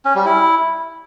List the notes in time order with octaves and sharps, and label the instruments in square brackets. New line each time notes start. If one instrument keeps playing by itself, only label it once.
[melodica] C#4
G3
E4